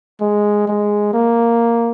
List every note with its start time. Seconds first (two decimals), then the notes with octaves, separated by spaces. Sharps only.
0.21 G#3
0.68 G#3
1.14 A#3